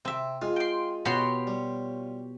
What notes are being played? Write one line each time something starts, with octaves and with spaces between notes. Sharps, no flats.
C3 C4 E5
G#3 F4 F5
G5 C6
B2 F#4 G4 C#5 B5 C6
G3